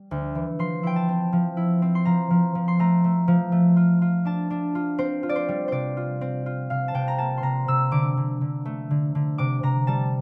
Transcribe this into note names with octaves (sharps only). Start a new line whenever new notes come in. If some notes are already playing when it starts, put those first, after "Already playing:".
Already playing: G3
D2
E3
F3 C6
E4 G5
A5
C4
F3
E4
C4
C6
F3 A#5
F3
F3
C6
A3 A#5
A3
F3
A3
F4
F4
D4 A5
D4
F4
C4 C5
F4
D5
C5
G3
C3 C5 D5
F4
C4
F4
C3 F5
A5
C3 G5
A#5
A#3 A5
C6
C3 A#5
C3 E6
D3 D6
D3
D3
A3
D3
D3
C3 D6
C3 A#5
G3 A5